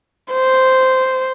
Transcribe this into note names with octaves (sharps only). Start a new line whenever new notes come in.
C5